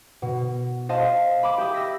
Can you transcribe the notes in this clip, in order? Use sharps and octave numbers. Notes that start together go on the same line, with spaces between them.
B2
C5 D#5 F5 A5
B5 D6
G4 E5 D#6
E6 A#6 B6